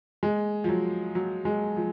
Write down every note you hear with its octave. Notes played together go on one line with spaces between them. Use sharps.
G#3
F3
F#3
F#3
G#3
F3